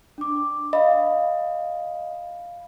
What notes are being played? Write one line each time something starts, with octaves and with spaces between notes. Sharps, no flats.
D4 D6
D#5 F5 B5